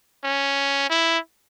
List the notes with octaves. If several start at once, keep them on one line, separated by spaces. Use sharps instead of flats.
C#4
E4